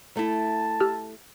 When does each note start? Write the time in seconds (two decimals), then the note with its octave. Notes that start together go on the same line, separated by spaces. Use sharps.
0.17 A3 E4 A5
0.80 G4 E6 F6